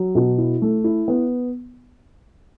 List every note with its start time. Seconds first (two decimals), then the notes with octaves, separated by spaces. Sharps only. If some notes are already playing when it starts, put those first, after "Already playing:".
Already playing: F#3
0.15 B2
0.38 E4
0.62 A3
0.84 E4
1.08 B3